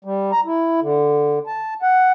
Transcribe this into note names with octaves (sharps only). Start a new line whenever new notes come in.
G3
A#5
E4
D3
A5
F#5